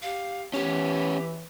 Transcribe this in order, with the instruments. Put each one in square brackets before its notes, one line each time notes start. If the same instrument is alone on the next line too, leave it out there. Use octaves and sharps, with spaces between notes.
[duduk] G4 [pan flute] F5
[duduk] E3 [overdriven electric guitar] B3 C#4 [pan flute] G4